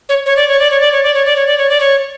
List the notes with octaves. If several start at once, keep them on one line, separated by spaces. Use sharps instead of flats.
C#5
C#5
D5
C#5
D5
C#5
D5
C#5
D5
C#5
D5
C#5
D5
C#5
D5
C#5